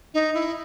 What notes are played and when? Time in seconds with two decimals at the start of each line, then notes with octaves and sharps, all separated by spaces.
0.14 D#4
0.34 E4